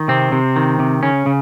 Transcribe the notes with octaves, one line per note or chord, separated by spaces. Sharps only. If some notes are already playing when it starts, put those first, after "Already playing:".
Already playing: D#3
C3 C4
C3
D#3
C3
C#3 C#4
C#3